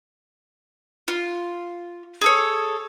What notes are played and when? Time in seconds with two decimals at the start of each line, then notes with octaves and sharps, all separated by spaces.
1.08 F4
2.21 G#4 A4 C#5